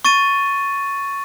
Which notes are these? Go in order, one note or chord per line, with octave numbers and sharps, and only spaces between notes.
C#6 A6 D#7